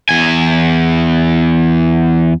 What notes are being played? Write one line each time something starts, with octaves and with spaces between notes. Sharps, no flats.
E2 G#5